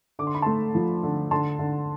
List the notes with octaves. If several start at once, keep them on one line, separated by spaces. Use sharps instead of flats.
D3 D6
C6
B5
A3 A5 C6
F3
D3
D3 A5 C6
D3